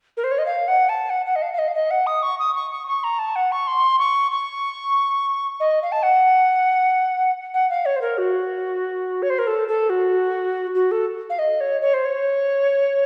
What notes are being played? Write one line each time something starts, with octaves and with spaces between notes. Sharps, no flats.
A#4
C5
C#5
D#5
F5
F#5
A5
F#5
F#5
D#5
F5
F5
D#5
F5
D#5
F#5
D#6
C#6
D#6
C#6
C#6
C#6
A#5
A5
F#5
C#6
C6
C#6
C#6
D#5
F5
A5
F#5
F#5
F5
C#5
C5
A#4
F#4
C#5
C5
A#4
A4
A4
F#4
F#4
A4
F5
D#5
C#5
C#5
C5
C#5